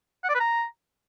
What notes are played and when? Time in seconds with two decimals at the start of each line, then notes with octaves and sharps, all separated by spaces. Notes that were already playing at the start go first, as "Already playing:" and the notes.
0.24 F#5
0.30 D5
0.35 B4
0.40 A#5